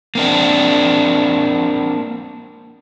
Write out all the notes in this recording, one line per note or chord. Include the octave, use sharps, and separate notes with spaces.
A#3 C4 D4